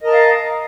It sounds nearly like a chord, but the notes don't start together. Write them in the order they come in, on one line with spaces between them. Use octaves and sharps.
D#5 A#4 A5 A#5 F5